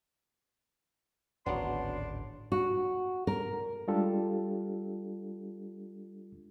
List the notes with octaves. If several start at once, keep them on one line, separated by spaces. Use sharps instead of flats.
D1 G#1 C#3 F#3 B3 D4 C6
F#4
A#4
G3 G#3 D4 F4 G4 A4